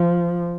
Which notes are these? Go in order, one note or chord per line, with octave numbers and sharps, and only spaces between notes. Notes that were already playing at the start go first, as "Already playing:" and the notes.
Already playing: F3